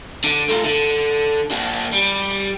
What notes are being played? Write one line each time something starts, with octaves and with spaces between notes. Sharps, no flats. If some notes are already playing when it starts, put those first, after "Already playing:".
D3
A3 F4
D3
A#3 D4
G3